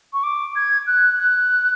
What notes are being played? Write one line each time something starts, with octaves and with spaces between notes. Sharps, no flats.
C#6
D6
G#6
F#6
F#6